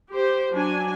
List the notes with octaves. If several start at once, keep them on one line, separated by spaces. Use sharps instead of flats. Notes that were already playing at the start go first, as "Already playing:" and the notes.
G4 C5
F#3 D4 G#5